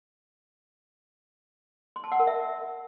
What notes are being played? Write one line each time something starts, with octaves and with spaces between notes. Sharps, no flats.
C6
A5
F#5
A#4
E5